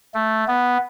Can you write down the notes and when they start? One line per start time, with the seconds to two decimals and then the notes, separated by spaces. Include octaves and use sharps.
0.14 A3
0.48 B3